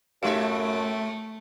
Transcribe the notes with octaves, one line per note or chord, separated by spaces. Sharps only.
F#2 A2 G#3 A3 D#4 G4 E5 F5